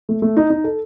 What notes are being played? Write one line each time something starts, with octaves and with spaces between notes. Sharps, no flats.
A3
A3
D#4
D#4
A4